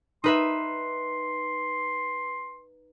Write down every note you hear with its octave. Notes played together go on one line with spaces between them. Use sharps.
D#4 B4 E5 C6